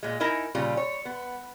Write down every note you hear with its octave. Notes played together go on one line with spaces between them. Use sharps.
A#2 G#3
D#4 E4 A#4 D#5 G#5
A#2 C#3 G3 F4
C#5
B3